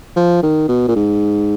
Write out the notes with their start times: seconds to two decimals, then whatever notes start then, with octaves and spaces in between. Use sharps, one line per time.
0.16 F3
0.43 D#3
0.69 B2
0.88 A#2
0.96 G#2